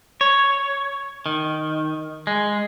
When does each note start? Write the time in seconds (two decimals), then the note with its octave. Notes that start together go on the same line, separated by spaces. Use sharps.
0.21 C#5
1.26 D#3
2.27 G#3